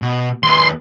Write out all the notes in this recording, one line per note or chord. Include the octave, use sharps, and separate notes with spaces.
B2
D#2 B4 C6